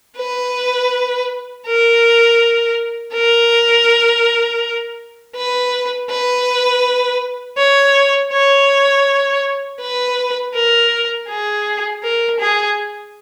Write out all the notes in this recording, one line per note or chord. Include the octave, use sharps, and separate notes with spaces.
B4
A#4
A#4
B4
B4
C#5
C#5
B4
A#4
G#4
A#4
G#4